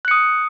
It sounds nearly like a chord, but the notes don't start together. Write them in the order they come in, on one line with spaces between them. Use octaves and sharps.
F#6 C#7 D#6